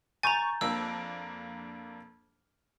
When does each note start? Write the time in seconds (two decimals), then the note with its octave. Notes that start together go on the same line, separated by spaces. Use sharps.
0.23 G#5 A#5 C#6 G6 A6
0.61 F2 A#3 D4 E6